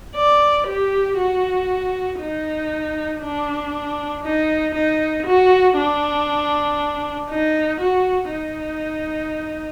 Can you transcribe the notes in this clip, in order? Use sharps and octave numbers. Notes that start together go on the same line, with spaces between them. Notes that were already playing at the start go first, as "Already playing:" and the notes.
D5
G4
F#4
D#4
D4
D#4
D#4
F#4
D4
D#4
F#4
D#4